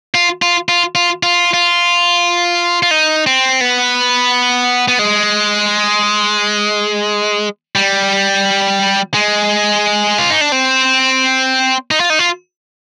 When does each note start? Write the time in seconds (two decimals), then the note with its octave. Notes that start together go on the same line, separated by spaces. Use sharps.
0.14 F4
0.42 F4
0.69 F4
0.95 F4
1.23 F4
1.54 F4
2.83 F4
2.91 D#4
3.26 C4
3.61 B3
4.88 B3
4.99 G#3
7.76 G3
9.14 G#3
10.18 F4
10.30 D#4
10.41 D4
10.52 C4
11.91 D#4
12.00 F4
12.10 D#4
12.19 F4